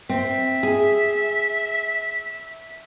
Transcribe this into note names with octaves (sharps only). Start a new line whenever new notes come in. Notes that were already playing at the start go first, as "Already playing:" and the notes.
C4 E5
G#4